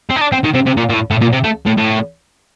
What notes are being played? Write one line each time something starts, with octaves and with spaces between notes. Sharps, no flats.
C4
D#4
D4
C4
D#3
C3
C3
A#2
A#2
A2
A2
A#2
C3
A3
A2
A2